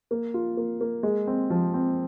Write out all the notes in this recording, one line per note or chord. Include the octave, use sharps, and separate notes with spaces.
A#3
F4
A#3
A#3
G#3
C4
F3
C4